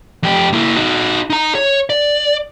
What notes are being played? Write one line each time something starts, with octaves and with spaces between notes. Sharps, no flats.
F2 G4
A#3 E4
D#4 F#4
D#4 A#5
C#5
D5